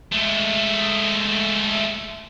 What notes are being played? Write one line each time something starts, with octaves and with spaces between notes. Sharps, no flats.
G#3 A3